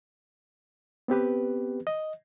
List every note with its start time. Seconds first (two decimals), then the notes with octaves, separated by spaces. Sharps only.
1.08 B3 C4 G4 B4
1.87 D#5